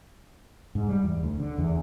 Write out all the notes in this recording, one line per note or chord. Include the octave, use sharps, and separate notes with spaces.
G#2
G3
E2
D2
D3
E2